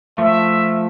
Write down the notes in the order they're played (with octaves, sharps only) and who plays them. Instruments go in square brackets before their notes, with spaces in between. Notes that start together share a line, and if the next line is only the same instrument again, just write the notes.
[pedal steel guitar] F3 A3 [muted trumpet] E5